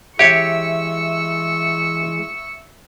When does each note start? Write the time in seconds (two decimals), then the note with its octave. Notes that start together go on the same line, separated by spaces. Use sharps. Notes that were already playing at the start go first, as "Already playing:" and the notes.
0.19 E3 G#3 G4 C#5 E5 C#6 E6